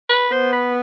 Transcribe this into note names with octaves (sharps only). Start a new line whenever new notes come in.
B4
B3 C5
B4